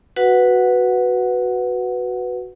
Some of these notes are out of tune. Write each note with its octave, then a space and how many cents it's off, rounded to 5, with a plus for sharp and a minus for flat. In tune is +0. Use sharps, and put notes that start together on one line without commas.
F#4 +0 B4 +0 F#5 -5